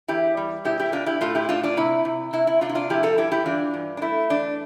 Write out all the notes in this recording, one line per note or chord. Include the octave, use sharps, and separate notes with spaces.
E2 E4 G4
G3
B2 E4 G4
E4 G4
B2 D4 F4
E4 G4
A2 F4 A4
E4 G4
A2 D4 F4
D4 F4
C3 E4
C3
C3 E4
E4
C3 D4 F4
E4
D4 F4
F3 E4 G4
F4 A4
G2 E4 G4
E4 G4
E3 D4 F4
G2
D4
A3 E4
E2 D4